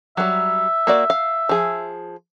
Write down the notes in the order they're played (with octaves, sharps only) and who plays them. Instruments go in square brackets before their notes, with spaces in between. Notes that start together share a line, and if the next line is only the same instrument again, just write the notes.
[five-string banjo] F#3 G3 [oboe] E5
[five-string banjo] A#3 F#4 D5
F5
F3 G#4